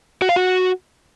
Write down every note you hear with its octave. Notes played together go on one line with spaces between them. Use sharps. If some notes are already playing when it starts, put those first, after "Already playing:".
F#4
F5
F#4